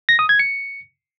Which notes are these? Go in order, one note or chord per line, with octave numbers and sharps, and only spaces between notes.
A#6
D#6
G#6
C#7